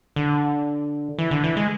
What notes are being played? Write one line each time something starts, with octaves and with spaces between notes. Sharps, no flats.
D3
E3
D3
E3
G#3